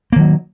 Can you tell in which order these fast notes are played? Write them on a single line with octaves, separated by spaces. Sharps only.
A#3 D#3 F#3